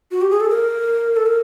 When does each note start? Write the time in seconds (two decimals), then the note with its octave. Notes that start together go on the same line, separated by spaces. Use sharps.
0.11 F#4
0.22 G4
0.30 G#4
0.40 A4
0.50 A#4
1.16 A4
1.26 A#4